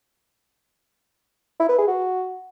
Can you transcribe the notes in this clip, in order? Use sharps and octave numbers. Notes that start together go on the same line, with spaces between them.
E4
B4
G#4
F#4